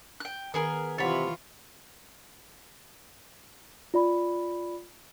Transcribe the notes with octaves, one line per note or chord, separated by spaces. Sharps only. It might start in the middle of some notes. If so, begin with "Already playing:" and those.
G5 F#6
D#3 B3 G#4 A#4
C3 E3 F4 C#5 F#5 B5 A6
F4 D5 B5